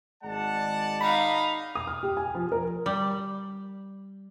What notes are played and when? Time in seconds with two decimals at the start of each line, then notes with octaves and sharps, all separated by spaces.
0.23 G#1 G#3 D5 F#5 A5
1.01 D#4 F5 B5
1.75 D#6
1.87 F6
2.03 G4
2.17 G#5
2.35 F3
2.52 A#4
2.86 G3